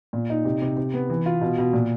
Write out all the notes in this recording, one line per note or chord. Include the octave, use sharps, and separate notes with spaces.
A#2
D#4
C3
C3
C3
B3
E3
F4
B2
B2
A#2